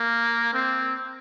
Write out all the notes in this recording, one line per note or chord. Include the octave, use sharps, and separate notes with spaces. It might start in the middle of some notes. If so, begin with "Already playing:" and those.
Already playing: A#3
C4